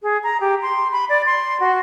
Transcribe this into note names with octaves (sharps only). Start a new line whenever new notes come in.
G#4
A#5
G4
C6
B5
D5
C6
F#4